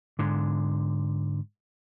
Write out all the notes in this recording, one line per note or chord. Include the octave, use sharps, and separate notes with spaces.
G#2 D3